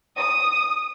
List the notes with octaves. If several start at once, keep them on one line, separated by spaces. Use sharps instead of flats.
D#6